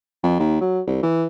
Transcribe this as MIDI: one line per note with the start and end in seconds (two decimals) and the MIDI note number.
0.23 0.39 41
0.40 0.57 39
0.61 0.81 54
0.87 1.02 36
1.03 1.27 52